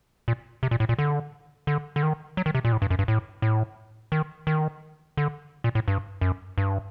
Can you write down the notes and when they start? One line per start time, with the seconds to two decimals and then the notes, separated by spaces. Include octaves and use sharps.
0.28 A#2
0.63 C3
0.71 A#2
0.80 A2
0.89 A#2
0.99 D3
1.67 D3
1.96 D3
2.03 D#3
2.37 F#3
2.46 D#3
2.55 C3
2.64 A#2
2.72 A2
2.82 G2
2.90 F#2
2.99 G2
3.08 A2
3.42 A2
4.12 D#3
4.47 D#3
5.17 D3
5.64 A#2
5.75 A2
5.88 G2
6.21 F#2
6.58 G2